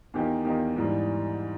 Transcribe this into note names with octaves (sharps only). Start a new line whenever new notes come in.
E2 D#3 A#3 D#4 G4
E2 D#3 A#3 D#4 G4
G#2 E3 G3